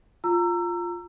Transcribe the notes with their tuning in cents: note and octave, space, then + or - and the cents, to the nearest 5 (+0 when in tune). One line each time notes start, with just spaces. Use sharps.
F4 +0 A#5 -15 E6 +25